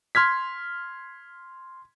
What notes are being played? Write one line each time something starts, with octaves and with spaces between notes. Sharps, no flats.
C6 F6 G#6 B6